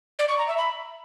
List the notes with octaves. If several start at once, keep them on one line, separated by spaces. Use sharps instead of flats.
D5
C#6
A#5
E5
B5